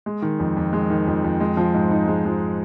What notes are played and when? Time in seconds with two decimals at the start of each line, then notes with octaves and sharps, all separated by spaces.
0.06 G#3
0.22 D#3
0.40 F2
0.57 F2
0.73 G#3
0.90 D#3
1.07 F2
1.24 F2
1.40 G#3
1.57 F3
1.75 G#2
1.91 D#4
2.08 G#3
2.25 F3